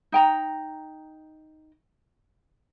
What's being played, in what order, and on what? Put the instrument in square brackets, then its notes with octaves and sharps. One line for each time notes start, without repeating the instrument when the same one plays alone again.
[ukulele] D#4 G5 A#5